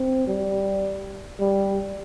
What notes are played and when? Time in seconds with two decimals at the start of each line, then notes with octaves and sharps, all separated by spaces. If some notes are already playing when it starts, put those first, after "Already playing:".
Already playing: C4
0.27 G3
1.40 G3